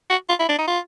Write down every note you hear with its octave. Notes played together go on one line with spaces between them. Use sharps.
F#4
F4
E4
D4
D#4
F4